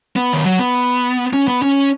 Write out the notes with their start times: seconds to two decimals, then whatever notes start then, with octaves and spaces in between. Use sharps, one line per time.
0.16 B3
0.33 D#3
0.45 F#3
0.59 B3
1.33 C#4
1.48 B3
1.62 C#4